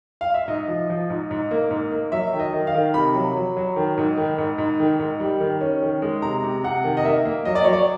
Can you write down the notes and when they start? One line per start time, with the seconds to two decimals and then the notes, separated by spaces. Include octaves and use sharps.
0.21 F5
0.34 E5
0.48 G#2 D#5
0.68 F3
0.90 F3
1.10 G#2
1.31 G#2
1.51 A#3
1.71 G#2
1.92 A#3
2.12 F#3 E5
2.33 D#3
2.39 D#5
2.53 D#3
2.67 F5
2.74 D#3
2.94 C3 B5
3.15 F#3
3.36 F#3
3.57 F#3
3.76 D#3
3.98 G#2
4.17 D#3
4.38 G#2
4.58 G#2
4.79 D#3
4.99 G#2
5.20 G3
5.40 D#3
5.61 C#4
5.82 D#3
6.02 G#3
6.22 C3 A#5
6.43 C3
6.64 C3 F#5
6.84 D#3
6.97 D#5
7.04 A#3 E5
7.25 A#3
7.45 F#3 D#5
7.55 D5
7.64 F#3 C#5
7.73 D5